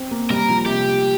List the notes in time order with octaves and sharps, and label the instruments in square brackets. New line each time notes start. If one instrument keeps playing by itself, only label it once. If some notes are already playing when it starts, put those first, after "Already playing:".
Already playing: [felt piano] C4
A#3
[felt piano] G3 [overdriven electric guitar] A#4
[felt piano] F3
[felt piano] C3 [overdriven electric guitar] G4